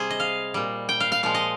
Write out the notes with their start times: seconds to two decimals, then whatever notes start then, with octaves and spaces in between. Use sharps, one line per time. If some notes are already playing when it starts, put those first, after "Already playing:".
Already playing: C3 G3 G#4 C5
0.10 D#5
0.20 F5
0.54 A#2 G3
0.89 G5
1.00 F5
1.12 F5
1.23 A#2 F3 G#3 F5
1.34 D#5